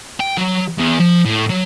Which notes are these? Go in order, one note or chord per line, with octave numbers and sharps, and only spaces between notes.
G5
F#3
E2
F3
A2
F#3